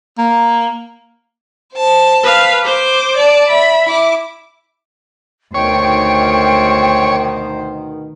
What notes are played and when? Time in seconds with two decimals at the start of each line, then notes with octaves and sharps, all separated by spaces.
0.18 A#3
1.74 C5 A5
2.23 B4 F5
2.65 C5 D6
3.17 D5 A5
3.49 E5 B5
3.86 E4 D6
5.54 D2 B2 D#3 C5 C#5 G5